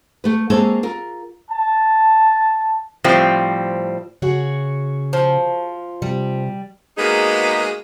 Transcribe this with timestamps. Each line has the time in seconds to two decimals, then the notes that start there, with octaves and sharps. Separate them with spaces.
0.24 A3 B4
0.50 G#3 A#3 C4 A4 B4 C#5
0.83 F4 A#4
1.51 A5
3.04 A2 F3 G3 C4
4.22 C#3 F#4 G#4 C#5
5.13 F3
6.02 C3 G3
6.98 G#3 A#3 B3 D#4 F#4 G#4